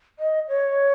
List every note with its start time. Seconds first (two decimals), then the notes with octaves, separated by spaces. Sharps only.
0.19 D#5
0.48 C#5